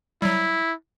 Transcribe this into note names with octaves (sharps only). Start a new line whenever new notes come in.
F#3 G3 E4